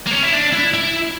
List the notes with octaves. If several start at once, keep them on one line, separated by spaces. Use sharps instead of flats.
A#3
C#4
E4
D4
E4
E4